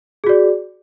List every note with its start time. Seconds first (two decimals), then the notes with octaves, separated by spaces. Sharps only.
0.24 G#4
0.26 F#4
0.29 D5